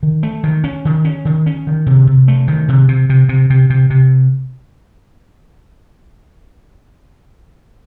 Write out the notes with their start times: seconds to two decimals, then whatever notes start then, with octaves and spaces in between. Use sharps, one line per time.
0.03 D#3
0.23 A3
0.44 D#3
0.64 C#4
0.85 D#3
1.05 C#4
1.25 D#3
1.46 C#4
1.67 D#3
1.86 C3
2.07 C3
2.28 A3
2.48 D#3
2.68 C3
2.88 C3
3.10 C3
3.29 C3
3.50 C3
3.70 C3
3.90 C3